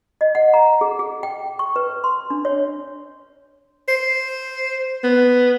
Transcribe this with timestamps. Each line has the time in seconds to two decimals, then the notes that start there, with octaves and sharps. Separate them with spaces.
0.21 D#5
0.35 F#5
0.54 A#5
0.81 G#4
0.99 G#4
1.23 G5
1.59 C#6
1.76 B4
2.04 C6
2.30 D4
2.45 C#5
3.88 C5
5.03 B3